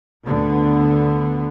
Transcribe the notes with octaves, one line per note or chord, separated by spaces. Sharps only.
D2 D3 B3